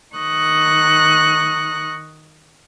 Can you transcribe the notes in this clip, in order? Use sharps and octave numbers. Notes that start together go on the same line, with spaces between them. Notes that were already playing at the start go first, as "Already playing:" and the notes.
D#3 C#6 D#6 F#6 A#6